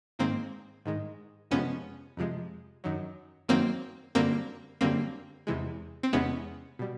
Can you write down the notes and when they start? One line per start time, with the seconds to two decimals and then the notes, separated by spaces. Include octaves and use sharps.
0.19 G#2 D#3 G#3 A#3 C4
0.85 G#2 D#3 G#3
1.51 F2 C3 F3 G#3 B3 C#4
2.17 F2 C3 F3 G#3
2.84 F#2 D#3 F#3
3.48 F#2 D#3 F#3 A#3 C4
4.15 F#2 D3 G3 A#3 C4
4.81 F#2 D3 G3 A#3 C4
5.47 E2 C3 E3 G#3
6.03 C4
6.13 E2 C3 E3 G#3 B3 C#4
6.79 B2 G3